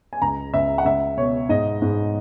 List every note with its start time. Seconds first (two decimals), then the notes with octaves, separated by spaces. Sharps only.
0.13 G#5
0.22 C#2 A#5
0.54 C#2 E5
0.78 F#5
0.85 C#2 E5
1.17 B2 C#5
1.49 G#2 D#5
1.82 G#2